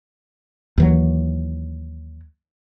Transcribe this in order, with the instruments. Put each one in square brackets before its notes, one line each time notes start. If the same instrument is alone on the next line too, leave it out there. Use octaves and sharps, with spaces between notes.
[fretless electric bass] D#2 E3 F#3